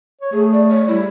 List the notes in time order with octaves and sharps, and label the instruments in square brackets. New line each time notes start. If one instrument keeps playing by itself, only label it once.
[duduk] C#5
[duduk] A3 [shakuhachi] G#4
[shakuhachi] D5
C#5
[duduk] G3 [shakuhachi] E4